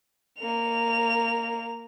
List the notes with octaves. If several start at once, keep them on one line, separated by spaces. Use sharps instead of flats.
A#3 F7